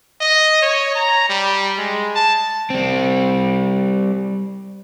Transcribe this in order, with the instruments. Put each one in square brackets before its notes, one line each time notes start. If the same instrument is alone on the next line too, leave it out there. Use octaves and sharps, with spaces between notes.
[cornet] D#5
C#5
A#5
G3
G#3
A5
[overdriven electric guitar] G3 C4